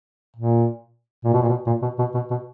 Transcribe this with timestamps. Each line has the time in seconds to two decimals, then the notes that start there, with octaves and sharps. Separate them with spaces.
0.36 A#2
1.24 A#2
1.33 B2
1.42 A#2
1.49 B2
1.66 A#2
1.82 B2
1.99 B2
2.14 B2
2.30 B2